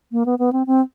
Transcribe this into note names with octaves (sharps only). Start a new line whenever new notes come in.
A#3
B3
B3
C4
C4